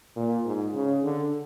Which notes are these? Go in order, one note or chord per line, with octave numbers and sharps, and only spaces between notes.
A#2
G#2
C#3
D3